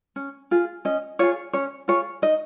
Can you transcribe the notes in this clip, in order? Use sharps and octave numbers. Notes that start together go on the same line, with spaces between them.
C#4
F4 G#4
C#4 D#5
F4 G#4 C#5
C#4 C#5
F4 G#4 C#5
D#4 D#5